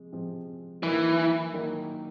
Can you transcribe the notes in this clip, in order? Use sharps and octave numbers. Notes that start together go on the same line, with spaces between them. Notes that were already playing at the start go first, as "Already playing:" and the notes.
Already playing: C3 F3 G#3
C3 F3 G#3 C4
D#3 E3 F#3 A#3 D#4
D#3 F#3 A#3 D#4